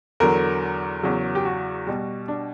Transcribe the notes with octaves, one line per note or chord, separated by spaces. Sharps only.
E2 D3 F#3 A#4
E2 C#3 F#3
G4
F#4
B2 G3
D4